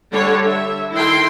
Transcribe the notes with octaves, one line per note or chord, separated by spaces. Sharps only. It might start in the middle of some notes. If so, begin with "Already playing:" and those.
D3 G3 C#5
E5
D#3 E4 A4 G5 C6